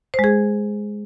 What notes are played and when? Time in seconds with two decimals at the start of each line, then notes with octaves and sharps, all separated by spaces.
0.14 C5
0.19 G#3
0.24 G#4